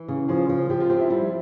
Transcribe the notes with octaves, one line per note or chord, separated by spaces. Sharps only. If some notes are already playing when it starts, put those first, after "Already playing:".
Already playing: E3
C#3
F3 G#4
F3
F3 G4
F4
C4 G4
E4
G3 E4